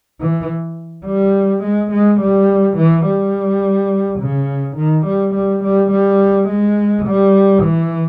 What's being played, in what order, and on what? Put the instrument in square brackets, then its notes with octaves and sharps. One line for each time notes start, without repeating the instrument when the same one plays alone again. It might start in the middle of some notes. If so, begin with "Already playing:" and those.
[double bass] E3
G3
G#3
G#3
G3
E3
G3
C#3
D#3
G3
G3
G3
G3
G#3
G3
E3